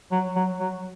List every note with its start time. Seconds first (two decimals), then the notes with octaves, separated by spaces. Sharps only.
0.12 F#3
0.36 F#3
0.60 F#3